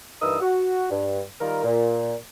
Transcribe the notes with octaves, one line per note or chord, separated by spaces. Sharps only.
G2 E3 D#4 A#4 D#6 E6
F#4
G2
D#3 G3 F4 A#4
A#2